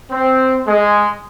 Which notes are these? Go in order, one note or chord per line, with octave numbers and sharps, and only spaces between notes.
C4
G#3